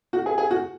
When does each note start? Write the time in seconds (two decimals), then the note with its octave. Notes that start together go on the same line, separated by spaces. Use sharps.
0.13 F#4
0.26 G#4
0.38 G#4
0.51 F#4